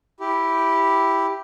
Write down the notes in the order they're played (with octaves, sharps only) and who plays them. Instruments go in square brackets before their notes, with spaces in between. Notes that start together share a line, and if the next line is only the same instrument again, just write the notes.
[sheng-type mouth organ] E4 G4